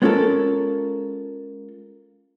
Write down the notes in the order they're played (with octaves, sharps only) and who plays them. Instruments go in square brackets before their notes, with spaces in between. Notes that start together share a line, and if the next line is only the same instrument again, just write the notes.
[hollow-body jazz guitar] G#3 B3 C#4 F4 A4 A#4